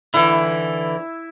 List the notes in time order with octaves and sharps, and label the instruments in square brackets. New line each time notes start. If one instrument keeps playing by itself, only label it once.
[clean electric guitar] D3 E3 [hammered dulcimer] E4